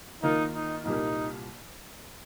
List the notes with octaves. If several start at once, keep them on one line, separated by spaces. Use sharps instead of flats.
D#3 A#3 D#4 F4 A#4
D#4
C2 A#2 G3 A#3 D#4